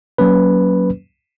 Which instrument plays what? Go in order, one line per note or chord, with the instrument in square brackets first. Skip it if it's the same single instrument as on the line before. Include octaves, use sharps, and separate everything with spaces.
[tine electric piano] F#3 A#3 C#4 B4